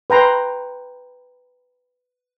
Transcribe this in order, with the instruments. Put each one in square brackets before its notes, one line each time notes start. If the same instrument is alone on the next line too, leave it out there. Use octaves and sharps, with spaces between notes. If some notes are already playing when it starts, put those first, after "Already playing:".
[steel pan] B4 G5 A#5 C6